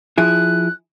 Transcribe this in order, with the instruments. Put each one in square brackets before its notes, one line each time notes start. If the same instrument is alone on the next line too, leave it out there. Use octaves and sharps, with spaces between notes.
[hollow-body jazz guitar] F3 E4 G#4 [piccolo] F#6